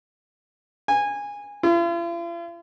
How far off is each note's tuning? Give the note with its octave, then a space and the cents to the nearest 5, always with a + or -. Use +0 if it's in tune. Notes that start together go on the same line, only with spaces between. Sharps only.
G#5 -20
F4 -45